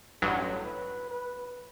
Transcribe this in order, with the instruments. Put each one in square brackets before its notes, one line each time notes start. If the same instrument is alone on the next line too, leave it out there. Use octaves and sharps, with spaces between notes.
[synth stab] A1 G2 F#3 [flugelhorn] A4
[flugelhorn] B4
B4